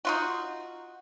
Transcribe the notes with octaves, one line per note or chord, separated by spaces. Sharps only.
D#4 F4 F#4